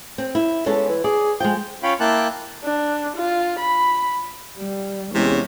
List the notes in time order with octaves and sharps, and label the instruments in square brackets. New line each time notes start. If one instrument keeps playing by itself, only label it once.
[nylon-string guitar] C4
E4
[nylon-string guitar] G#3 B3 A4 [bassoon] C#4
[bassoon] E3
[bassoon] G#4 [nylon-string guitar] D5
[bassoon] F3 [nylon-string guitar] G#3 G5
[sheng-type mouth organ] C#4 F4 C#5 F5 G5 B5
A#3 E4 G5 A5 D6 F#6
[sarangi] D4
F4
B5
[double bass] G3
[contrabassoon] E2 [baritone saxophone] C3 [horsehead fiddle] G#3 [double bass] C#4